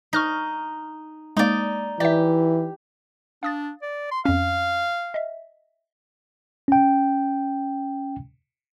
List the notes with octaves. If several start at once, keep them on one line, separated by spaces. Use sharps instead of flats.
D#4 C#6 F6 A#6
G#3 A#3 D#4 D5
E3 G4 D5 E5
D4 F5 D#6 A6
D5
C6
F2 C#4 F5
D#5 E5
C#4 G5